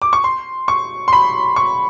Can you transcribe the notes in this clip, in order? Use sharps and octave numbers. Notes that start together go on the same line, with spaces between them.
D6
C#6
C6
C#6
C6
B5
C#6